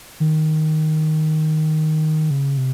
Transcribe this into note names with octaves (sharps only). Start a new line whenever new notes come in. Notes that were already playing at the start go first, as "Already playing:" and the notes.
D#3
C#3
C3